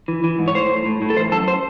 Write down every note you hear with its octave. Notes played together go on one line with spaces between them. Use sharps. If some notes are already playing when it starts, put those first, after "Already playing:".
E3
E3
G#2
C#5
A2 C5
A2
A2
A2
A4
E3 C5
F#2 A4
C5